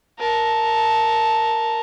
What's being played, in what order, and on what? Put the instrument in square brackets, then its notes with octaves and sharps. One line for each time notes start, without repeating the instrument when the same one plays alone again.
[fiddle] A#4 A5